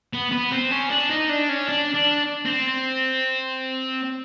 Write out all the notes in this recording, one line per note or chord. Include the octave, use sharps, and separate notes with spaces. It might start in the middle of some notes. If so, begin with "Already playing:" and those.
B3
B3
C4
C#4
D4
D#4
D4
C#4
D4
D4
C4